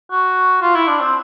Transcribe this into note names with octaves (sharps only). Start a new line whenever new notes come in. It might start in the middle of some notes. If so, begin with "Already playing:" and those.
F#4
F4
E4
D4
C4